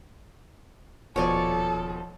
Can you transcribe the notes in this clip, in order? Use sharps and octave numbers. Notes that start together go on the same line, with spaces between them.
D#1 B2 F3 A4 C#5 D5 G#5